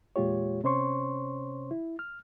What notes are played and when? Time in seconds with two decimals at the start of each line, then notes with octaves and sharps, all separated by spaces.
0.16 E2 A#2 G#3 F4 G4 C#5
0.64 C3 C#4 C5 C#5 C6 C#6
1.71 E4
1.99 F6